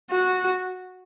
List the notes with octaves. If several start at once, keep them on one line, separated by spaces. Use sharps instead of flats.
F#4